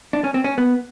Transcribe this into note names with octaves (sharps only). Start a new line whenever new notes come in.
D4
C#4
C4
C#4
B3